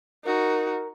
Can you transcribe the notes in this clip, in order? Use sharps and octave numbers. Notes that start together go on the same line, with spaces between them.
D#4 F#4 A#4